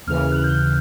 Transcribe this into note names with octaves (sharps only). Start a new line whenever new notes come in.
D#2 C#3 E3 F6
F6
F#6
G6